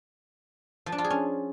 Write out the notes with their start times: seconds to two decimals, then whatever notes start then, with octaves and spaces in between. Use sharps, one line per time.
0.86 F3
0.92 D4
0.98 F4
1.04 G#4
1.10 C#4